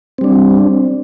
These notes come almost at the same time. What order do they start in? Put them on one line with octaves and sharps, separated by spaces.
C4 G3 D4